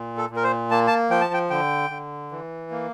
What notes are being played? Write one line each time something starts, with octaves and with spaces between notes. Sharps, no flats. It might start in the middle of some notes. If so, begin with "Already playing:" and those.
Already playing: A#2
A4
A#2
A#4
C5
A#3 A5
A5
F3 G5
A5
G5
D3 G5
D3
E3
A#3